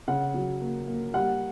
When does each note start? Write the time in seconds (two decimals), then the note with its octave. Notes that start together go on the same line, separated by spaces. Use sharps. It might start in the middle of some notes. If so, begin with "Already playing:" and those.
0.08 C#3 F#5
0.34 F#3
0.61 A#3
0.87 A#3
1.14 G3 F#5